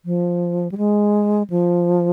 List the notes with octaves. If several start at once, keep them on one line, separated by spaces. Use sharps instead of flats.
F3
G3
G#3
F3